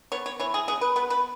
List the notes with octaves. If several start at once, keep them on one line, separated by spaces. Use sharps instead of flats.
B3 C#5
C#5
E3 C#5
G#4
B3 G#4
B4
B3 B4
B4